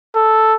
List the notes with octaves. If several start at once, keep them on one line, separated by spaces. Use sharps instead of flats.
A4